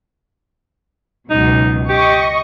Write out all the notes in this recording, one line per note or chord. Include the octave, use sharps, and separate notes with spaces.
C#2 F#2 B2 D#4
G4 D#5 C#6